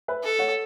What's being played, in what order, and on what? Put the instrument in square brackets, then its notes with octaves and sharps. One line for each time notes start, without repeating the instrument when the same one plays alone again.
[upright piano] B4 E5
[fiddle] A4
[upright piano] C#5 F#5